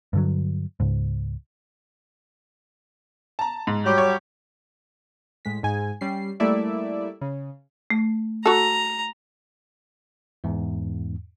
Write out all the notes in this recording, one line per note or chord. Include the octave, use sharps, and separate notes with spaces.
G2 D3 F#3
C#2 G#2
A5 A#5
G#2
F#3 G3 G4
C#5
A2 G#3 B6
G#2 G#5
G3 C#4 C7
G3 A3 A#3 E4 D5 E5
C#3
A3
F#4 A4 A#5
E2 G#2